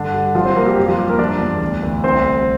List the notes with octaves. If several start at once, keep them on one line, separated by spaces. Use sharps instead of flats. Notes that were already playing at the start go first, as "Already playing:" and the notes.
Already playing: G2 D3 D4
G3
F3 G3 F4
C4 C5
C3 A#3 A#4
G3 G4
F2 G3 G4
F3 F4
G3 G4
A#3 A#4
F3 D4 D5
E2
D2
D2
C2 C4 C5
C2